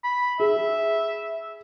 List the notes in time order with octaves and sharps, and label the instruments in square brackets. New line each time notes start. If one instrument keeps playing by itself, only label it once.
[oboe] B5
[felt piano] G#4 [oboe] E5